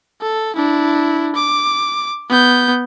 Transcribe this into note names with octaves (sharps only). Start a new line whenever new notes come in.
A4
D4 E4
D6
B3 G6